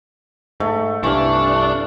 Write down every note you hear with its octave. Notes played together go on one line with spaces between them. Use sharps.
G#2 A3
C2 G2 E3 D4 F5 C#6